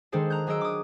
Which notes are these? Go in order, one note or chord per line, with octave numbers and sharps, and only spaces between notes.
D#3 G#3 D4 G#4 A4 C5
A#5 F#6 G6
F#3 G#4 D#5 E6 D7
D6 D#6